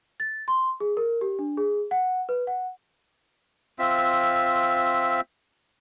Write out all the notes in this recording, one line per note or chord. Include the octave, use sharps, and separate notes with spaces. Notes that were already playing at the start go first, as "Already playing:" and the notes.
A6
C6
G#4
A#4
G4
D4
G#4
F#5
B4
F#5
C4 F4 E5